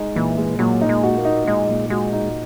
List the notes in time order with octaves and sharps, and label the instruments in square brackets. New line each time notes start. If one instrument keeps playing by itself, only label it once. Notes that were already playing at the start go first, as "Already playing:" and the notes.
Already playing: [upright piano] G#3 D#4
[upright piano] A#2 [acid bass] E3
[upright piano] G#3
[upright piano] A#2 [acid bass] F#3
[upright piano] D#4
[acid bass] G#3
[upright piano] F#4
[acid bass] A#3
[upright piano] D#4
[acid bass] G#3 [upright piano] D#4
[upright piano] A#2
[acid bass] G#3 [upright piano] F#4
[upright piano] D#4